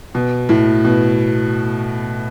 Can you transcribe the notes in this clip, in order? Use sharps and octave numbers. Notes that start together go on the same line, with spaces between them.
B2
A2
B2